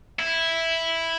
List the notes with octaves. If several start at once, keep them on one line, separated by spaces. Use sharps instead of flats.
E4